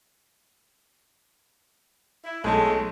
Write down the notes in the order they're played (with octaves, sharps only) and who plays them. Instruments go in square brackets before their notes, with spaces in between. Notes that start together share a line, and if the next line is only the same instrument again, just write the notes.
[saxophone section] E4
[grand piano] B1 A3 A5 [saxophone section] G#3